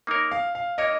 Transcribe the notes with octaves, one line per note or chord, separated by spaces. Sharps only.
A#3 D#4 A#4 C#5
F5
F5
A#3 D#4 A#4 C#5 D#5